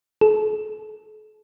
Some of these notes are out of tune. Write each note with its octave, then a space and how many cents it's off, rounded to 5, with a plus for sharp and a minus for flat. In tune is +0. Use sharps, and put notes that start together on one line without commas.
A4 -45